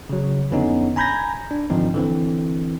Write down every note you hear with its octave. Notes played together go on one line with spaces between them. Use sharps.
C#3 F#3
F2 D3 B3 C#4 D#4
G#5 A#5 B5 G6 G#6 A#6
D4
G#2 D3 D#3 F3 C4 D#4
D3 E3 C4